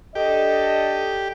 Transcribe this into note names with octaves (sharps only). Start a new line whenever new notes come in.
D4 G4 A4 D#5